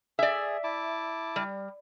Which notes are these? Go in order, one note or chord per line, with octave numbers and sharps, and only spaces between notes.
G#4 D5 E5
E4 A5 D6
G3